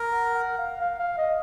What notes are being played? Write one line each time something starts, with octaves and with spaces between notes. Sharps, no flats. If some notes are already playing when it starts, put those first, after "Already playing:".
Already playing: A#4
F#5
F#5
F5
F5
F5
D#5